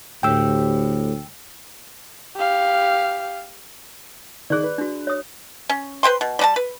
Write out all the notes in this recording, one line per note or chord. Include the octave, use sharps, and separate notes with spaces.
D2 A2 G4 G5 E6
G4 F5
D#3 G#4 D5 F#6
B4
D4 F#4
C#5 D#6
C#4
B4 C5 G5 C6
B2
G3 D4 A5
B4